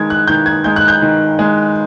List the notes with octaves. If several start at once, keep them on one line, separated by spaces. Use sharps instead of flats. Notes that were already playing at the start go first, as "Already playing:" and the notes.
Already playing: D#3 G#3 G#6
F#6
D#3 G6
G#6
G#3 G6
F#6
G6
D#3
G#3